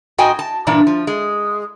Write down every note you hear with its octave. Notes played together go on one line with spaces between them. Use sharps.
G#2 F#4 D#5 G5 G#5
A5
G2 A#2 E3 D4
F3
G#3